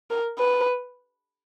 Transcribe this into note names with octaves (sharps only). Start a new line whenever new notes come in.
A#4
B4